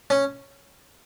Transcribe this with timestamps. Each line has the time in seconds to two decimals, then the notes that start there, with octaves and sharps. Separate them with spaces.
0.10 C#4